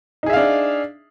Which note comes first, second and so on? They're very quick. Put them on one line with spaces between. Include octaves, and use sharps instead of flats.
D#4 G#4 E5 F5 D4